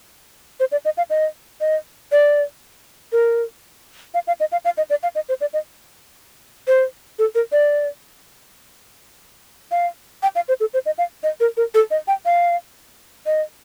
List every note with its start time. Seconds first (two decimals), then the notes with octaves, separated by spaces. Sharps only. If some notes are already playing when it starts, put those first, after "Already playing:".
0.60 C5
0.72 D5
0.85 D#5
0.97 F5
1.10 D#5
1.61 D#5
2.12 D5
3.12 A#4
4.14 F5
4.27 F5
4.40 D#5
4.52 F5
4.65 F5
4.78 D#5
4.90 D5
5.03 F5
5.15 D#5
5.29 C5
5.41 D5
5.53 D#5
6.67 C5
7.19 A4
7.35 A#4
7.52 D5
9.71 F5
10.23 G5
10.35 F5
10.48 C5
10.60 A4
10.74 C5
10.86 D#5
10.98 F5
11.23 D#5
11.40 A#4
11.57 A#4
11.74 A4
11.91 D#5
12.08 G5
12.26 F5
13.26 D#5